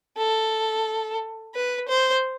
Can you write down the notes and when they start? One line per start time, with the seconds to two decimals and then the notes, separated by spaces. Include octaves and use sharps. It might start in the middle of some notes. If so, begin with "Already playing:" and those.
0.17 A4
1.55 B4
1.89 C5